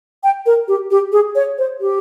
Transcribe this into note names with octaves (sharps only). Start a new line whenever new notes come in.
G5
A#4
G4
G4
G#4
C#5
C5
G4